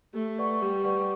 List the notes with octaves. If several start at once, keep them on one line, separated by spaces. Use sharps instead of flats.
A3 G4
B4 D5 F#5 C#6
G3 G4
B4 D5 F#5 C#6